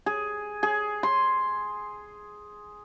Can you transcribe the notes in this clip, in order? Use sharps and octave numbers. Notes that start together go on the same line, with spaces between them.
G#4
G#4
C6